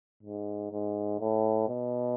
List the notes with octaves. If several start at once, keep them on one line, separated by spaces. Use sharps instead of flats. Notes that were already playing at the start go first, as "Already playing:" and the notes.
G#2
G#2
A2
B2